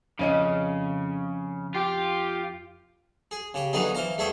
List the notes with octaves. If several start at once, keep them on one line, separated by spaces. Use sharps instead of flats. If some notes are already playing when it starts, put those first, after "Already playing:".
F2 C#3 C#4 D#5
F4 G4
G#4
C#3 G4
D3 E3 F#3 B3 D#4 G#4
E3 C5 F5 A#5
E2 A3 G#4 E5 G5 C#6